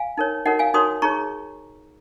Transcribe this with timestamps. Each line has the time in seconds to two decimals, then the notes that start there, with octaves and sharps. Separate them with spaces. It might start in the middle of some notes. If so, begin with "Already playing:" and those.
Already playing: F5 G#5
0.17 D#4 A#4 C#5
0.46 D#4 F#4 A#4 C#5 D#5 F#5
0.59 F5 G#5
0.74 D#4 F#4 A#4 C#5 C6 D#6
1.02 D#4 G#4 C#5 A#5 C#6